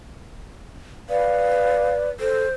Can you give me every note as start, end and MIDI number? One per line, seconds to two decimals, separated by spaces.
1.09 2.10 71
1.09 2.10 74
1.09 1.94 77
2.20 2.46 69
2.20 2.54 72